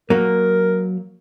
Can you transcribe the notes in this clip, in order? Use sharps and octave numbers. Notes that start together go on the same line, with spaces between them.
F#3 A#3 A#4